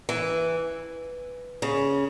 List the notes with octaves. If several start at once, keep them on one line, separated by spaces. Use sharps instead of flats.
E3
C#3